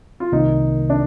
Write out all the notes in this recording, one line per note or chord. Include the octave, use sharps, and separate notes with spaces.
F4
C2 C3 D#3 A#3 D#4
D4